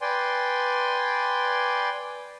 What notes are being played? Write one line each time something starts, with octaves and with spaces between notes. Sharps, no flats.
B4 D5 G5 G#5 C6